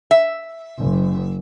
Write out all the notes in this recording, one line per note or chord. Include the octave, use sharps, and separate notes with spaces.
E5
F#1